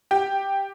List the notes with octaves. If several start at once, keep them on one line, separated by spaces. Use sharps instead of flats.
G4